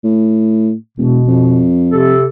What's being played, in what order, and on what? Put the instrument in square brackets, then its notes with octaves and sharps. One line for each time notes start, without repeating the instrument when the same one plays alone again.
[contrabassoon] A2
[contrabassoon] E1 [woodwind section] B2
[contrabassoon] F2
[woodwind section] C3 G4 A4